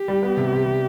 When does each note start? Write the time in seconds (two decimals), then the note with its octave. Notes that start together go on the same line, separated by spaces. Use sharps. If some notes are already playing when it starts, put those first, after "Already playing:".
Already playing: G4
0.08 G3
0.23 B3
0.37 C3
0.52 C3
0.66 C3